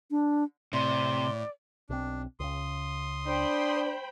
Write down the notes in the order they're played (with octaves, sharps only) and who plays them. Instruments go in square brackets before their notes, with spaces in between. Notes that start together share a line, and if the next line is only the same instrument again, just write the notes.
[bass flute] D4
[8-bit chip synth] A2 [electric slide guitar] C3 [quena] D5 [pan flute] C6
[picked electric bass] B1 C4 [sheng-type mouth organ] D4
[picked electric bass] C#2 C#3 [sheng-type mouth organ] C6 D#6
[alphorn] D4 [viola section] C5 G5 B5